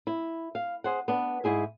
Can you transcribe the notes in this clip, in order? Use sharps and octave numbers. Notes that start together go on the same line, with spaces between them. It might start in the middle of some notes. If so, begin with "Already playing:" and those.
E4
F5
G#4 C5 F#5
B3 D4
G#2 E4 G#4 E5